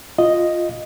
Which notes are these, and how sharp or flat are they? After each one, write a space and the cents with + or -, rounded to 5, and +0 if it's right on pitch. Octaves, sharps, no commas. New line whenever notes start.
F4 +0 D#5 +0